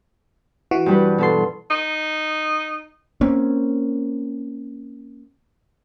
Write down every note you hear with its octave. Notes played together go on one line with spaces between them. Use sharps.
E3 F#4
G2 G3 B4
B2 A4 C6
D#4
A#3 C4 C#4